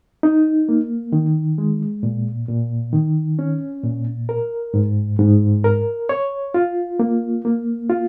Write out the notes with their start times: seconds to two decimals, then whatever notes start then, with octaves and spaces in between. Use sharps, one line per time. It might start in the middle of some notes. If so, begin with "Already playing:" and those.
0.23 D#4
0.69 A#3
1.12 D#3
1.58 G#3
2.03 A#2
2.49 A#2
2.93 D#3
3.39 C#4
3.84 A#2
4.29 A#4
4.74 G#2
5.19 G#2
5.64 A#4
6.09 C#5
6.54 F4
7.00 A#3
7.45 A#3
7.90 F4